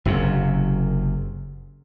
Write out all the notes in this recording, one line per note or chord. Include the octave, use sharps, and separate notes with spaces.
F#1 F#2 C3